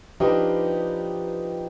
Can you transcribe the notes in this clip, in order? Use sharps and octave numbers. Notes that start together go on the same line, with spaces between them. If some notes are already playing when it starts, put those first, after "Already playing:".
F3 D4 D#4 G4 B4